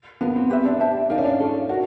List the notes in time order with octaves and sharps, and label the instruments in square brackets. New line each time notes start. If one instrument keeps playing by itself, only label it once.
[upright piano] B3 [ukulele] D4 F4 A#4
[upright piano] C4
[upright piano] C4 [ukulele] G4 B4 E5
[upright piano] D4
[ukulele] G4 C5 E5 A5
[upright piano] D#4 [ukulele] A#4 D5 F5
[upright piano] C#4
D4
[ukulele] F4 A4 C#5
[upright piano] F#4 [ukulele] A#4